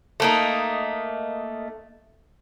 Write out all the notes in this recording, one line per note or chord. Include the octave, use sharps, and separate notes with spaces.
A3 A#3 D#4